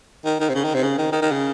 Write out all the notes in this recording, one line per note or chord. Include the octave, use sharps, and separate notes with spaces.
D#3
D#3
C3
C#3
D#3
C3
C#3
D#3
D#3
D#3
C#3